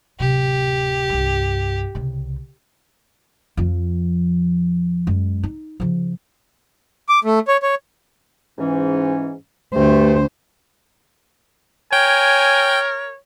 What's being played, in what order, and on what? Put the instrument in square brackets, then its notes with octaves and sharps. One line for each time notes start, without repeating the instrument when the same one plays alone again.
[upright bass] D1 C3 [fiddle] G4
[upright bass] C2 G2
C2 C#3
F2 F3
F#2 G#3
D#4
C#3 F3
[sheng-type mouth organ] D6
A3
C#5
C#5
[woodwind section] G#2 E3 C#4
[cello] D2 C5 [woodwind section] G2 A3
[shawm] A#4 [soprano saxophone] C#5 [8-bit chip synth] G5 [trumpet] G#5